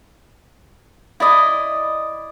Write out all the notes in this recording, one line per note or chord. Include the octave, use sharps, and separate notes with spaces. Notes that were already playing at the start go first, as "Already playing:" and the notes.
E4 D5 D#5